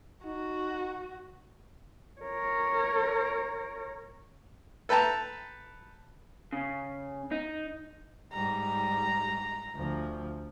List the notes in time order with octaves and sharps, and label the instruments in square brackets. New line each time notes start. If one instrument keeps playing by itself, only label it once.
[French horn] D#4 [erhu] F#4
[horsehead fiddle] A#4 C#5
[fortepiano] A4 B4 G5 A5 A#5
[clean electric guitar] C#3
D#4
[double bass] G#2 G3 [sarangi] A#5
[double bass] D2 F3